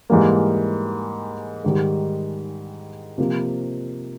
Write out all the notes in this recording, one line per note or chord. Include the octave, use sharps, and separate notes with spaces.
G#2 E3 G3 A#3
G#2 D#3 G3
C3 F3 A#3